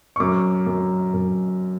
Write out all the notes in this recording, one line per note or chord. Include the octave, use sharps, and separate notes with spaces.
C#6
F#2 D6
F#2
F#2